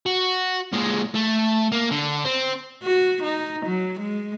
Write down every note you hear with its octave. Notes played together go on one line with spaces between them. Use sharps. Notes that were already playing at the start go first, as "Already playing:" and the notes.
F#4
A#2 G#3
A3
A#3
D3
C4
F#4
D#4
F#3
G#3